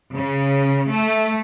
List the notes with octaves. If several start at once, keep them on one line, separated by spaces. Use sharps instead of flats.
C#3
A3